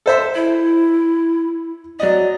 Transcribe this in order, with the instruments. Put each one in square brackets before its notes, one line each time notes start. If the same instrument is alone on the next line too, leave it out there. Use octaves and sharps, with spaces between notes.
[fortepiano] A4 C5 E5
[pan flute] E4
[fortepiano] F#3 D#5 [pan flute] D5